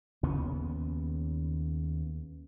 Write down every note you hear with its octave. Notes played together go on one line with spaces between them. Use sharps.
D#2 C#3 B3